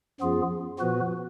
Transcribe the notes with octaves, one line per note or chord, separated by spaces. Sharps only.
F#2 F3 B3 F4 G#4
A#2 F3 B3 F#4 B4